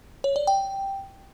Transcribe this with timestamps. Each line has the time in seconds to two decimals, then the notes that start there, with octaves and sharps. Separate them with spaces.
0.24 C#5
0.36 D5
0.47 G5